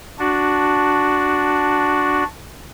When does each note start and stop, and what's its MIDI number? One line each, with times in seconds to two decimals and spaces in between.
0.19 2.24 62
0.19 2.24 66